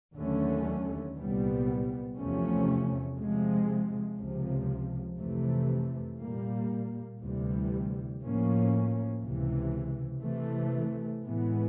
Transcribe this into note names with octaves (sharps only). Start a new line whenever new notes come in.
D#2 D3 F#3 A3 C#4
C2 A#2 G3 B3
E2 C3 F3 A3 C#4
C3 F3 G#3
C#2 C3 F3
F2 C3 E3 A3
A#2 G3 A#3
D2 C3 E3 G3
A2 F3 A#3 C#4
C#2 C3 E3
C3 E3 A3
A2 E3 G#3 B3